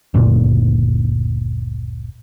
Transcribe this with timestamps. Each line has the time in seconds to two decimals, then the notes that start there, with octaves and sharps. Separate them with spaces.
0.14 F#1 D2 A#2